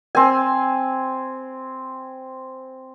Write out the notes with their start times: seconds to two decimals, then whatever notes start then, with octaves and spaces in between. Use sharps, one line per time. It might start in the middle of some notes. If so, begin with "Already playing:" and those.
0.15 C4 G#5